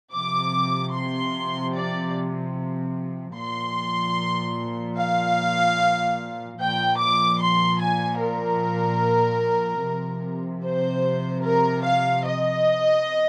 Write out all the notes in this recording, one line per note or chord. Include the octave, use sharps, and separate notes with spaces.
C3 F3 D6
C6
D5
A#2 F3 C6
F5
A#2 F3 G5
D6
C6
G#5
A#4
C3 F3
C5
A#4
F5
D#5